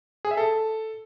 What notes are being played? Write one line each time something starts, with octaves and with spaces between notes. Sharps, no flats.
G#4
E5
A4